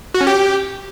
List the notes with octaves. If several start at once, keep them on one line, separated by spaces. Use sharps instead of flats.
F#4
C#4
G4